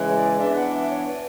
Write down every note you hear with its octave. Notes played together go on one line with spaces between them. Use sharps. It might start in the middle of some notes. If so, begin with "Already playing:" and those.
Already playing: C#3 E3 G#3
C#5
D5
E3 B3 D4 E5
F#5
E5
C#5
B4